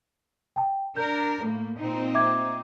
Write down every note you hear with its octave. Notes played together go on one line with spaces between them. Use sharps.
G5 A5
D4 A#4 G6
A2 A#3
A#2 C4 D#4
E5 D6 G#6